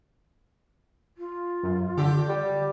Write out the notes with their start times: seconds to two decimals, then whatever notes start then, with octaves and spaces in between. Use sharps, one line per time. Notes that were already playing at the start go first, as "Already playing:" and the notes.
1.18 F4
1.63 F#2
1.97 D3 G4
2.29 G3